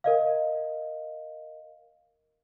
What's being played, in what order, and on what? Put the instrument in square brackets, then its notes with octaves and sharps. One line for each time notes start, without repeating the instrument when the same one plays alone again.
[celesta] A#4 D#5 F5